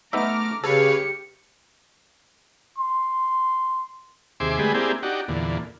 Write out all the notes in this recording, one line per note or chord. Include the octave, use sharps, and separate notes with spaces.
A3 B3 D#4 E5 A#5 D6 F6
C#3 G4 A4 B4 C#5 F5 C#7
C6
D#2 C3 G#4 E5 C6 D6
D3 G#3 A3 G4 G#4 B4
A#3 C4 D4 E4 G4 G#4
D4 D#4 F#4 G4
E2 A#2 D3